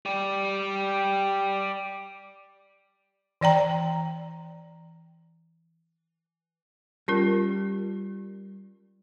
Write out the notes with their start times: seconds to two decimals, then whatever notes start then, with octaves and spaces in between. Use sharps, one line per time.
0.06 G4 D5
3.41 E3 D5 G5 A#5
7.08 G3 C#4 F4 A#4